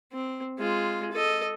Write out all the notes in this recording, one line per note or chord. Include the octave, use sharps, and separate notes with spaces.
C4
G#3 F4
A4 D#5